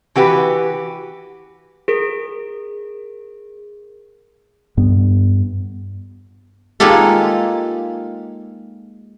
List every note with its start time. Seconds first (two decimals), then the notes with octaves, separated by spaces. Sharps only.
0.16 E3 F#4 G4 B4
1.88 G#4 A#4 D7
4.77 G2 B3
6.80 G#3 A#3 D#4 F4 G4 A4